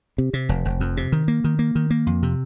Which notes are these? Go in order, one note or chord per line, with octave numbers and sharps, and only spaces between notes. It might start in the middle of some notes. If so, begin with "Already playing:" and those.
C3
C3
F1
F1
F2
C3
D#3
A#3
D#3
A#3
D#3
A#3
F2
C3